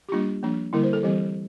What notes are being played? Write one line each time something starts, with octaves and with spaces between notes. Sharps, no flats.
G4
G3 A#3 D4 F4
F3 A#3 D4
D3 G3 A#3 E4
C5
A4
E3 G3 C4 G4